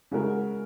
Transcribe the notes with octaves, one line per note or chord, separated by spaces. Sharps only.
C#3 G#3 F#4 A#4